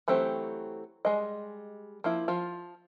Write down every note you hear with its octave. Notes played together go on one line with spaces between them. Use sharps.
E3 F#3 A3 C4 G4
G3 G#3 D#5
F3 A#3 E4
F3 F4